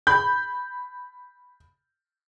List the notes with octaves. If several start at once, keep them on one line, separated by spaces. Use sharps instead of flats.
B5 G6